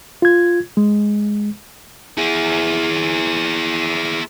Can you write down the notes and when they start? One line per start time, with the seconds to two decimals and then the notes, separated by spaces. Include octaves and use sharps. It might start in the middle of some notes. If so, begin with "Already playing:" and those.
0.22 F4 G#6
0.77 G#3
2.18 E4 G#4